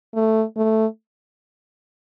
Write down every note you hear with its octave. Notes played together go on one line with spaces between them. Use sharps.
A3
A3